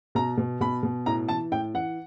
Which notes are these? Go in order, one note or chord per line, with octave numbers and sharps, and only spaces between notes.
B2 A#5
B2
B2 B5
B2
A2 A#5
E3 A5
A2 G5
E3 F#5